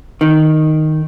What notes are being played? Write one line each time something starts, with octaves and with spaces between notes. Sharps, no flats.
D#3